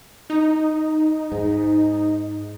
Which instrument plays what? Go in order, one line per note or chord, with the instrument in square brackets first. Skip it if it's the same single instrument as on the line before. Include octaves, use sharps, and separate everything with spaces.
[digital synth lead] D#4
[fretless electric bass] G#2